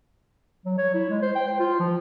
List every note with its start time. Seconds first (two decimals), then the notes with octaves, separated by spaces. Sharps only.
0.65 F#3
0.78 C#5
0.94 E4
1.09 G#3
1.22 C5
1.35 G5
1.48 C5
1.59 F4
1.80 F3